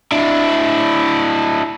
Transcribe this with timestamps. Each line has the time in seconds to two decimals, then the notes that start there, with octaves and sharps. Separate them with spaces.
0.12 D4 E4